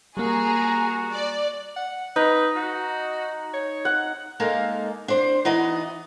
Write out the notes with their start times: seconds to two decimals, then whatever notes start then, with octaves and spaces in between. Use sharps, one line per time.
0.17 G3 A#3 F#4 G#4 A#5
1.12 D5
1.76 F#5
2.16 D#4 B4
2.55 F#4
3.54 C#5
3.85 F#5
4.40 G#3 A#3 D#4 A4 F5
5.08 D4 C5
5.45 E3 B3 D#4 F#4 D#5